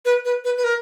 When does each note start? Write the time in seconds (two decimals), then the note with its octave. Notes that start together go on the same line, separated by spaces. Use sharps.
0.05 B4
0.25 B4
0.44 B4
0.58 B4
0.64 A#4